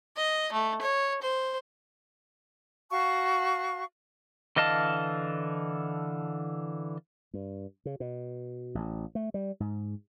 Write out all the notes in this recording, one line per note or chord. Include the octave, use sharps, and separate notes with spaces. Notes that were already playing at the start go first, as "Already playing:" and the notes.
D#5
A3
C#5
C5
F#4 F5 A5 C#6
D3 E3 D#5 F5 A5
G2
C#3
B2
A1
A3
G3
G#2